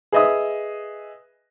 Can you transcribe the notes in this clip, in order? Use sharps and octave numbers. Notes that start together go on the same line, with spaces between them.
G#4 B4 D#5 E5 D#6